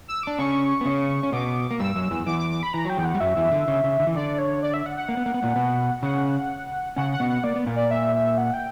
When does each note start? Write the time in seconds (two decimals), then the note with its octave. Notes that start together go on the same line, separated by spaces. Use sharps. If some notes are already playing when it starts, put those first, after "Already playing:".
0.08 E6
0.23 D4 D6
0.39 C#3 C#4 C#6
0.81 B3
0.86 C#3 C#4
1.23 C#4
1.32 B2 B3 D6
1.71 A#3
1.79 G2 G3 E6
1.96 F#2 F#3
2.11 E2 E3
2.26 E2 E3 D6
2.39 D6
2.51 D6
2.63 B5
2.73 E3 A#5
2.85 F#3 G5
2.97 E2 E3
3.05 F#5
3.14 G3
3.20 F#2 F#3 E5
3.37 E2 E3
3.52 D3
3.68 C#3
3.84 C#3
4.00 D3
4.07 E3
4.15 D3 D5
4.38 C#5
4.63 D5
4.74 E5
4.86 F#5
4.97 F#5
5.09 A#3
5.17 B3
5.26 A#3
5.34 B3
5.43 A#2 A#3
5.56 B2 B3
6.03 C#3 C#4 F#5
6.96 C#3 C#4 F#5
7.13 F#5
7.20 B2 B3
7.29 F#5
7.44 A#3 D5
7.56 B3
7.66 A#2 A#3
7.76 D5
7.91 E5
8.15 E5
8.38 F#5
8.54 G5